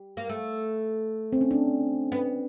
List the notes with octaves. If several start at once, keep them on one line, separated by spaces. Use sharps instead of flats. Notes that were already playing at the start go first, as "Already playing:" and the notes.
Already playing: G3
A#3
A3
C4
C#4
D4
B3